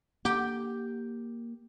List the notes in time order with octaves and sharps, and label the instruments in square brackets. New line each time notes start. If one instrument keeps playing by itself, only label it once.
[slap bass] A#3 [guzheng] G4 G5